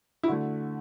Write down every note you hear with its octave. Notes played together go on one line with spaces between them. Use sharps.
E4
D3 A3 F#4